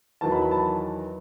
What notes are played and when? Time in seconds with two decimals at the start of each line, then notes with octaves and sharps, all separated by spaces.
0.21 E2 D#3 F#3 A5
0.32 B5
0.42 B5
0.51 A5